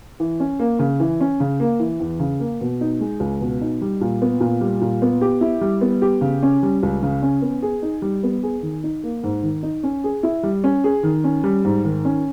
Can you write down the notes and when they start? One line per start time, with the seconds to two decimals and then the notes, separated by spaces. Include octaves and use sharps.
0.20 E3
0.40 C#4
0.59 A#3
0.79 C#3
1.00 E3
1.20 C#4
1.40 C#3
1.60 A#3
1.79 E3
2.00 E2
2.20 C#3
2.40 A#3
2.61 B2
2.81 D#4
3.00 G#3
3.20 C#2
3.41 B2
3.61 D#4
3.81 G3
4.01 A#2
4.22 B3
4.41 A#2
4.61 G3
4.82 A#2
5.02 B3
5.21 G4
5.41 E4
5.61 G3
5.81 B3
6.02 G4
6.21 C#3
6.43 C#4
6.63 G3
6.83 C#2
7.03 C#3
7.22 C#4
7.42 B3
7.62 G#4
7.82 D#4
8.02 G3
8.23 B3
8.43 G#4
8.62 D#3
8.84 D#4
9.03 A#3
9.24 G#2
9.43 D#3
9.63 D#4
9.83 C#4
10.04 G#4
10.23 E4
10.43 G3
10.64 C#4
10.84 G#4
11.03 D#3
11.24 C#4
11.44 G3
11.65 G#2
11.84 D#3
12.05 C#4